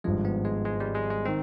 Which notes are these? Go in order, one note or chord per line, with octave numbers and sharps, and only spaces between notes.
G#1 G2 F3 G#3
B3
G#3
G#3
G3
G#3
G#3
D#3 C4